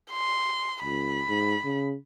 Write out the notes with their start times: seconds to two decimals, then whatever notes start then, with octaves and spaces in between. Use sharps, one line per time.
0.11 C6
0.84 C#2 B5
1.29 G#2
1.65 C#3